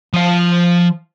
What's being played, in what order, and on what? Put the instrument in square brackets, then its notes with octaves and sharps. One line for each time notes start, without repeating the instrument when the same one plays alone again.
[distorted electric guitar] F3 F5